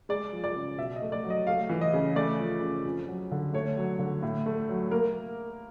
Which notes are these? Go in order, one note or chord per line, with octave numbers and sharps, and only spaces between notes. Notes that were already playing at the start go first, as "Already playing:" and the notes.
G#3 D5
F3
D5
C#3
B2 E5
D#5
A3
D5
F#3
D#5
A3 F5
E3
D#5
C#3
A3 D5
F3
C#3
F2
F#3
D3
A3 C#5
F#3
D3
A2
A3
F#3
A#3 A#4